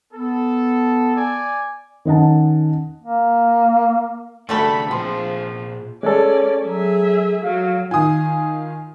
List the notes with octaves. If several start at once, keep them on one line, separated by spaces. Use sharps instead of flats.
B3 A4
D5 G#5
D#3 C#4 D#5 F#5 A5
A#3
C#3 G3 A3 D4 F#4 A4 B5
A#2 F3 C4 G#4
G#3 C#4 A4 C#5 D5
F#3 G#4 E5
F#3 F5
D#3 F4 G#5 D#6